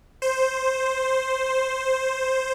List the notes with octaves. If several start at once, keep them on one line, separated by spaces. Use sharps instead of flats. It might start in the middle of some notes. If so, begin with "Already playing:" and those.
C5